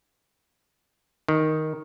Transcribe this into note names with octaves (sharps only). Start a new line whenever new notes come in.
D#3